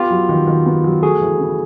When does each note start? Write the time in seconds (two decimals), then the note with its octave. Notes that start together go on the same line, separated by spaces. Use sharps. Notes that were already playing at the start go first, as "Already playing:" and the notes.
Already playing: B3 F4 G4
0.10 F#3
0.29 D#3
0.47 D#3
0.66 B3
0.84 F#3
1.02 A3 F#4 G#4
1.21 E3
1.40 C#3